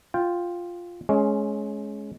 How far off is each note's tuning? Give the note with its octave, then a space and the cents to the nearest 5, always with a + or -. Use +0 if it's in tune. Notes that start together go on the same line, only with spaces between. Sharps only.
F4 +0 G5 +0
G#3 +25 C#4 +0